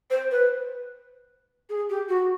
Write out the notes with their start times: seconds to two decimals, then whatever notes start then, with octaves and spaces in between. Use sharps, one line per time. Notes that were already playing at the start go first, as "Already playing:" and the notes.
0.10 C5
0.31 B4
1.69 G#4
1.89 G4
2.08 F#4